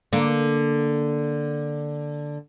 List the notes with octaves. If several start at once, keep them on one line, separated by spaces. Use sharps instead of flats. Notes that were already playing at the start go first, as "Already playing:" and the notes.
D3 A#3